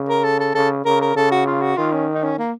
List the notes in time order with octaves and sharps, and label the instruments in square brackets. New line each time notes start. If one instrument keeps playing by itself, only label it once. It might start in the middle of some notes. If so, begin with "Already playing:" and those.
Already playing: [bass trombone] C#3
[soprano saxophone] A#4
A4
A4
[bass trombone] C#3 [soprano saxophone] A4
[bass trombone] C#3 [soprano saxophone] A#4
[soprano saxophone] A#4
[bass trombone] C#3 [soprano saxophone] A4
[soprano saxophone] F#4
F4
F#4
[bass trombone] D#3 [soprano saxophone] F4
[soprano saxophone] C#4
D#4
C#4
A#3